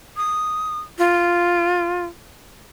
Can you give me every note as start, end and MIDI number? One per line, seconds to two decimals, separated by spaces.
0.17 0.80 87
0.99 2.05 65